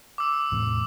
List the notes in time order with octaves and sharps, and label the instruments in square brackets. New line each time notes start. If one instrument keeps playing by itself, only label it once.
[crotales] D6 E6
[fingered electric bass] E2 A2 C3